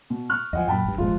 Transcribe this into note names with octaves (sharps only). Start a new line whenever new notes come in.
B2
C#6 F6 F#6
E2 F3 D#5 F#5 G#5
F#2 A#2 G5 A5 B5
G#1 G2
D#1 G#1 G2 F3 G#3 F4